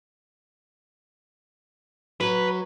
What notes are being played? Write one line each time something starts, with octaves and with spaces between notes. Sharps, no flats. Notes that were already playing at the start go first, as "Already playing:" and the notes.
F#3 B4